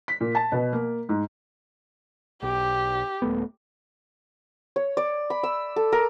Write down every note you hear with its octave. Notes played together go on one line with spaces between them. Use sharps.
B6
A#2
A5
B2
A#3
G#2
B1 G4
D#1 A3 B3
C#5
D5
B5
E6
A4
A#4